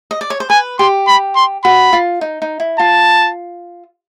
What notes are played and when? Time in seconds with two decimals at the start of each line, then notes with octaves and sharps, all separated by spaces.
0.11 D#5
0.21 D5
0.30 C#5
0.40 C5
0.50 B4 G#5
0.79 G4 C6
1.07 B5
1.36 C6
1.64 F#4 B5
1.93 F4
2.21 D#4
2.42 D#4
2.60 E4
2.79 F4 A5